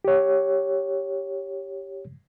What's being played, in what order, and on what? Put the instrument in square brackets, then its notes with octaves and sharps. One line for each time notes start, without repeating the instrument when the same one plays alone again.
[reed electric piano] G4 C#5